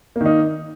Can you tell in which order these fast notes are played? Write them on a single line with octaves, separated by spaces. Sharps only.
A#3 D#3 D#4